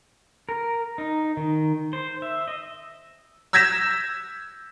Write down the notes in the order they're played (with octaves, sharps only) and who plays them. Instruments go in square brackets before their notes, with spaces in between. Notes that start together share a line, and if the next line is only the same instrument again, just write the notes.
[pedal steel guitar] A#4
D#4
D#3
C5
E5
D#5
[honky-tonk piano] E6 G6 G#6 A#6 B6 E7